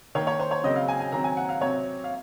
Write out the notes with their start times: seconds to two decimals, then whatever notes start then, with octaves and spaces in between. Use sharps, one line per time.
0.15 D#3 C#5
0.18 A#3
0.27 C#5
0.39 C5
0.51 C#5
0.64 C#3 F#3 C4 D#5
0.76 F5
0.88 G#5
1.00 G#5
1.12 D#3 F#3 C4 A#5
1.24 G#5
1.37 F#5
1.49 F5
1.61 C3 F#3 C4 C#5
2.04 F5